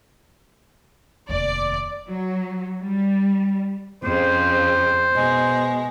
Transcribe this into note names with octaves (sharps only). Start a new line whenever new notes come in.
F1 D#2 D5
F#3
G3
F2 C#3 C5
B2 G#3